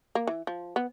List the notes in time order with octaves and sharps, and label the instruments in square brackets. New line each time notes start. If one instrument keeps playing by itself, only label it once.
[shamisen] A#3
E3
F3
B3